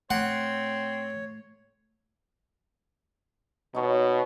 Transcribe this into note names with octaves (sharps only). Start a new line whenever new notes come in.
A3 C4 C#5 F#5
B2 D#4 C#5